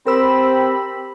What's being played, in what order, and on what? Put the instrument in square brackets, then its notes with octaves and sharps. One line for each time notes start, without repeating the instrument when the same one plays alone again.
[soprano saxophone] C4 [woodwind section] G4 B5 [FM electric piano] A#4 E6